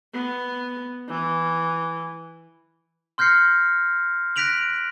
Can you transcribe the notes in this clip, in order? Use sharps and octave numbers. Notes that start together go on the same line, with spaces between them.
B3
E3
C6 F6 G6 A#6 C7 C#7
F#6 A#6 B6 D7 F7 F#7